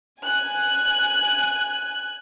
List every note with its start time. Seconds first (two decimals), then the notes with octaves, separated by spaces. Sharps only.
0.22 G#5 F#6